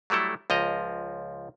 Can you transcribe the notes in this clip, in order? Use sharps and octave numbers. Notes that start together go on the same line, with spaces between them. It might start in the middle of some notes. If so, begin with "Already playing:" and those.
F#3 G3 A3 E4 A4
C#2 F3 D#5 A#5